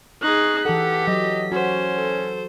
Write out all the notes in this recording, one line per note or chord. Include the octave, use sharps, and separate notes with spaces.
D#4 G#4 C#6 F#6 C7
E3 G4 A4 F#5 B6
F#3 D#5
C#4 F#4 C5
A4